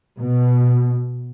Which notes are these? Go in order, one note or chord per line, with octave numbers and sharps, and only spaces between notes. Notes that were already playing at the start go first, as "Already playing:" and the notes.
B2